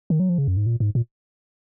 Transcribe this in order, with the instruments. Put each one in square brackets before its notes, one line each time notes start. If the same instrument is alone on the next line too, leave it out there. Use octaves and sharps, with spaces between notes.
[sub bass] D#3
F#3
F3
C#3
F#2
G#2
A#2
G#2
A#2